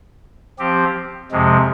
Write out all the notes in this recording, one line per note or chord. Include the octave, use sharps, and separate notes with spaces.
F3 C4 G4
F2 C3 F3 G#3